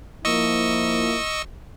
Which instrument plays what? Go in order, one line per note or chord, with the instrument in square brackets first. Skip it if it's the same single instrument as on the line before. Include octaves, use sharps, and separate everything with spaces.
[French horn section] F3 A#3 E4 [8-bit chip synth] D#5 C#6 E6